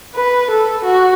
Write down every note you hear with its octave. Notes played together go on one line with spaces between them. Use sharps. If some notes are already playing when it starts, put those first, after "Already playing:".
B4
A4
F#4